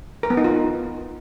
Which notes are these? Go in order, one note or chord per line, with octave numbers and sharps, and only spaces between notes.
A#4
B3
D#4
F4